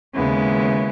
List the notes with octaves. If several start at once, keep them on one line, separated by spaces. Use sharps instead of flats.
D#2 C#3 G#3 B3 E4